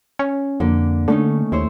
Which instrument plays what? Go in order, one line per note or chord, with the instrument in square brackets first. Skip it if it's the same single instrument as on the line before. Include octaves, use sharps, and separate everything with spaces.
[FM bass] C#4
[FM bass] F2 [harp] D3 A#3
[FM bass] D3 [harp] A3 C#4 D#4
[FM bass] D#2 [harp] E4 C5 C#5